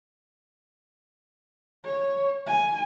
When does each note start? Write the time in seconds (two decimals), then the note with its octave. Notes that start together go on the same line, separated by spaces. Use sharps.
1.84 C#5
2.47 G#5